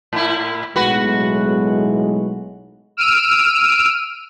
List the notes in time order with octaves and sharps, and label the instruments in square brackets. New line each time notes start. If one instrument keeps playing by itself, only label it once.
[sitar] A2 E4
[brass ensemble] B1 A2 G#3 [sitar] F#4 B4
[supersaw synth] E6 F6 D7 D#7